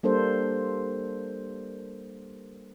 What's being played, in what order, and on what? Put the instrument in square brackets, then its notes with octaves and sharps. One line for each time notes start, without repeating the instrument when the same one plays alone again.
[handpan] G3 A#3 D4 A4 C5